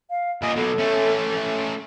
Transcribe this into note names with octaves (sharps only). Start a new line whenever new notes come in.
F5
A#2 D#5 G#5
B2 F#3 A4
A3 C#4